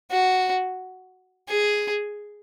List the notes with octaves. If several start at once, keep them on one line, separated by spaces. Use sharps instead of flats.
F#4
G#4